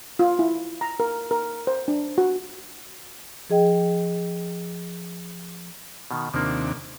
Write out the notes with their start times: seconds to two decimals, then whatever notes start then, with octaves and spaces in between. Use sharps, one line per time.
0.19 F4
0.39 E4
0.81 A#5
1.00 A#4
1.31 A#4
1.67 C5
1.88 D4
2.18 F#4
3.50 F3 G#4 D#5 G5
6.11 B2 D#3
6.34 D#2 C3 F3 A#3 D4